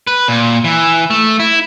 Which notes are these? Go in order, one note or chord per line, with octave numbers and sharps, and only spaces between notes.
B4
A#2
E3
A3
E4